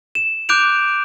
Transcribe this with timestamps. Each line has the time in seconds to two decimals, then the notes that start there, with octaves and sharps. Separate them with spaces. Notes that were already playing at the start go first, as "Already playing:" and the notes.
0.15 E7
0.49 D6 F#6 G6 D7 F7